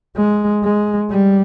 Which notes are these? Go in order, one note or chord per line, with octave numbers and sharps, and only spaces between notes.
G#3
G#3
G3